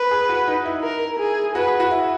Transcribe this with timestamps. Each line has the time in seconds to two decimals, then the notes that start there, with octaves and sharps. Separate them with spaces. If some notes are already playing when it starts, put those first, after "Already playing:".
Already playing: B4
0.11 G#4
0.29 F#4
0.48 D#4
0.66 E4
0.83 A#4
1.19 G#4
1.55 F#4 B4
1.67 G#4
1.80 F#4
1.91 E4